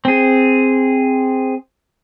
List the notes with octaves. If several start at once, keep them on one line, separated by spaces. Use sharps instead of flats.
C4 G#4